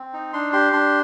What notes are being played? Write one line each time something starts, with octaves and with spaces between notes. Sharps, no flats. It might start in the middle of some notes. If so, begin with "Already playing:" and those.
Already playing: C4
D#4
D4 C6
G4 C6
D4 C6